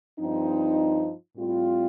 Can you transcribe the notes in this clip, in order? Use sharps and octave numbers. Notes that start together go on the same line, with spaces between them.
G2 F3 C4 D#4
A2 G3 C4 F4